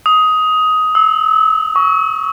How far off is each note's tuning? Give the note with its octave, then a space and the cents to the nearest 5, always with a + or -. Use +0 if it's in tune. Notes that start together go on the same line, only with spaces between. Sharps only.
D#6 +15
E6 -30
C#6 +15